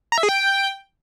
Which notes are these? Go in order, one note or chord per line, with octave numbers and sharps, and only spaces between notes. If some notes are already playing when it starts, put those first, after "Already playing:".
A#5
E5
G#4
G5